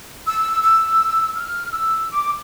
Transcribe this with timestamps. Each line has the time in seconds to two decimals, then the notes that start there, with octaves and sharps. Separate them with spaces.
0.27 E6
0.63 E6
1.36 F6
1.73 E6
2.10 D6